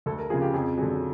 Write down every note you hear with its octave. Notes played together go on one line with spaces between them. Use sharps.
D2 A4
A#4
C#3 F3 G#4
G4
F2 G#4
D3 F#3 G#4